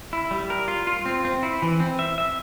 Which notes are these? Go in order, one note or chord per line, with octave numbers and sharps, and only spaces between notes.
E4
G3
A#4
F4
F4
C4
C4
E4
E3
C4
E5
E5